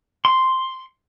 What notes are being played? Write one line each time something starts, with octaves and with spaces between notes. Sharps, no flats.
C6